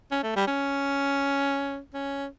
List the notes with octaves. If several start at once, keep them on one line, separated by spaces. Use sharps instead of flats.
C#4
A3
G3
C#4
C#4